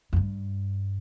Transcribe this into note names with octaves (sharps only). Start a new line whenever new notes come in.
F2
G2